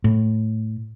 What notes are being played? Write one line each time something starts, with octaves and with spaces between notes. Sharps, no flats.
A2